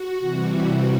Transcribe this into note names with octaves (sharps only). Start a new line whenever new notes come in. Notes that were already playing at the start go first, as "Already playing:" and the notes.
Already playing: F#4
C3 E3 G3